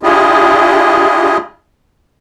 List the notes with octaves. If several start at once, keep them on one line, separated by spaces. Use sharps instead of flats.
D4 E4 F4 G4 G#4 D#5